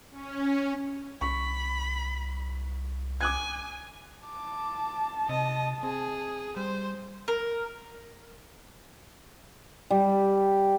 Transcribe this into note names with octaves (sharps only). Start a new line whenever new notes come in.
C#4
C2 B5 C#6
G#5 D6 F#6 G#6
A5 D6
C3 D#5
C4 G#4
G3 C5
A#4
G3